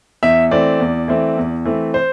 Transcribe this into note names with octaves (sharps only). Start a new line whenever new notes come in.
E2 E5
E3 A3 C4 D5
E2
E3 A3 C4
E2
E3 A3 C4
C5